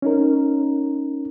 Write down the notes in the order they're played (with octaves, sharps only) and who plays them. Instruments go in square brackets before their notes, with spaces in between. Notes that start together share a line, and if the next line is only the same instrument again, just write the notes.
[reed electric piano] C#4 D#4 A#4